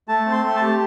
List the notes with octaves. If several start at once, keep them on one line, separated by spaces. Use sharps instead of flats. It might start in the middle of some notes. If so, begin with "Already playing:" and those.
A3 A5
C4
C6
A3
A5
G4